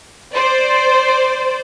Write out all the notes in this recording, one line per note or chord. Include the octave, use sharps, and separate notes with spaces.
C5 D5